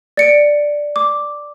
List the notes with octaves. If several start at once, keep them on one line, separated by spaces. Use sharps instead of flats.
D5 C#7 D7
D6